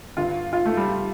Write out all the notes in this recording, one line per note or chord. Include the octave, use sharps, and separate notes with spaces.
G2 D3 F4
F4
A3
G3